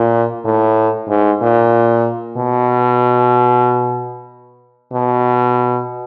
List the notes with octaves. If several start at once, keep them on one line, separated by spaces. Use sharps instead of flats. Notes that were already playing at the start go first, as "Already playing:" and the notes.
Already playing: A#2
A2
G#2
A#2
B2
B2